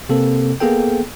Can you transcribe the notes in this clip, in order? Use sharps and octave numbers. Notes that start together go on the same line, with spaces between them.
C3 A#3 C4 A4
A#3 B3 G#4 A4 G5